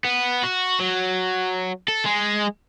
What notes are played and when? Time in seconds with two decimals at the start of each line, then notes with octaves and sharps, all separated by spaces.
0.05 B3
0.43 F#4
0.80 F#3
1.88 A4
2.05 G#3